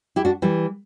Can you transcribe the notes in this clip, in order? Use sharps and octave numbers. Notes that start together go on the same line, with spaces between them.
E4 G4
D4 F#4
E3 G3